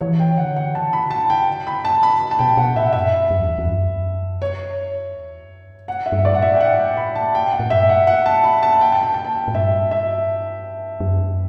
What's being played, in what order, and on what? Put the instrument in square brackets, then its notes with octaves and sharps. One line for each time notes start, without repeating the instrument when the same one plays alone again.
[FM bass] E3 [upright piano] C#5
[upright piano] G5
[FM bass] D3 [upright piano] F#5
[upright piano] F#5
[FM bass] C#3 [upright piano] A5
[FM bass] D3
[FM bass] C#3 [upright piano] B5
[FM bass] D3 [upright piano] A5
[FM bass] C#3
[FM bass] D3 [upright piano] G5
[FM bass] C#3
D3
C#3
[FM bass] D3 [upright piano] B5
[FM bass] C#3 [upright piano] A5
[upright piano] B5
A5
[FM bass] B2 [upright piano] G5
[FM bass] B2 [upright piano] F#5
[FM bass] A2 [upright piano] E5
[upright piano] F#5
[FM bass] F#2 [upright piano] E5
[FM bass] F#2
E2
E2
F#2
[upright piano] C#5
[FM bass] E2
F#2
G2
[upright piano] F#5
E5
[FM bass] G2
[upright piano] D5
[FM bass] A2 [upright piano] F#5
[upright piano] E5
G5
F#5
G5
B5
A5
[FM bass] G2 [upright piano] G5
[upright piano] F#5
[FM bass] A2
[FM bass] G2 [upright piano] E5
[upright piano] F#5
F#5
A5
B5
A5
G5
A5
G5
A5
G5
[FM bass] A2
[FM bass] G2 [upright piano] E5
[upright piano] E5
[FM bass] F#2